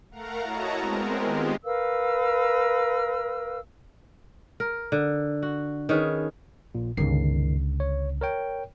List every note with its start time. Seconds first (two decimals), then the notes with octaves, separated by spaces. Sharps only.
0.11 A3 A#4 F5 F#5 A#5
0.42 E4 F#4 C#5 D#5 A5 A#5
0.77 G#3 B3 C4 A#4
1.20 D#3 G#3 F4 G4
1.64 A#4 B4 F5 E6
4.60 A#4
4.92 D3
5.43 F#4
5.89 D#3 C#4 G#4 B4
6.75 A#1 A#2
6.97 G1 C#2 D3 D#3 C7
7.80 C#5
8.21 A#4 C#5 G5